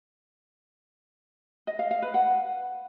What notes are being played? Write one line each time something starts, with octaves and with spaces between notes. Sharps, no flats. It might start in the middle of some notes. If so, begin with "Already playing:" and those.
D#5
F5
F5
B4
F#5